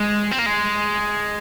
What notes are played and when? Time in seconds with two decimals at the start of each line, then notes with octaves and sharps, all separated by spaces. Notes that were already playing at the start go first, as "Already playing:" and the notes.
Already playing: G#3
0.31 C4
0.39 A#3
0.46 G#3